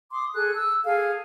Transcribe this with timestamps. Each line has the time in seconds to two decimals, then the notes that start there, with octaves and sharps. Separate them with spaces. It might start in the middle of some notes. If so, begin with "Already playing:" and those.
0.12 C6 D6 D#6
0.34 G#4 A4 F#6
0.54 E6
0.84 G#4 A4 F5